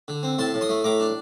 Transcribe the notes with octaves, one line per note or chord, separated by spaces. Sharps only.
D3
C4
A2 A5 C6
A2
C6 D#6
A3
A2 A#5 D6
D4